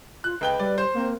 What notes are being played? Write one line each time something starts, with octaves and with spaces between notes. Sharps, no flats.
F4 F#6
C#2 B4 G5 G7
G3 D5
C5
A#3 C4